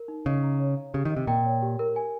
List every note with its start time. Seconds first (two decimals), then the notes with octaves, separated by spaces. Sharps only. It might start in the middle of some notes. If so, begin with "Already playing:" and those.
Already playing: A#4
0.08 D#4
0.26 C#3 D#5
0.43 A#5
0.60 C#5
0.77 F5
0.94 C#3 G4
1.05 D#3
1.11 D#5
1.16 C3
1.27 A#2 G5
1.45 C#5
1.62 G4
1.79 A#4
1.96 G#5